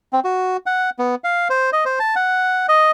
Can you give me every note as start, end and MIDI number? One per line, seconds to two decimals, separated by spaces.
0.13 0.20 60
0.24 0.57 66
0.66 0.90 78
0.99 1.15 59
1.24 1.48 77
1.50 1.70 72
1.73 1.84 75
1.85 1.99 72
1.99 2.15 81
2.16 2.66 78
2.69 2.91 75